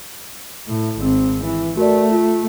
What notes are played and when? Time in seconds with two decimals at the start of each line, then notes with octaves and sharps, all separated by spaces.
0.68 A2
0.99 G#1 C4
1.43 E3
1.77 A3 F#4 A#4 D5
2.11 F4